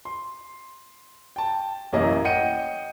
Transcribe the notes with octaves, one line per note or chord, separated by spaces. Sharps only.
C6
G5 A5
A1 F#2 A#3 C#4 E4 D#5
D#5 F#5 G5 G6 C#7 D#7